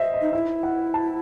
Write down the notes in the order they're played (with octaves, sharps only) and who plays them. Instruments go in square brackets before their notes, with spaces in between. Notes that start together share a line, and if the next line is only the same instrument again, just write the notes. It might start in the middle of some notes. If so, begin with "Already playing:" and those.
Already playing: [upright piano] C5 D#5 E5
D#5
[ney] D#4
[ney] E4 [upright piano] E5
[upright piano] F#5
A5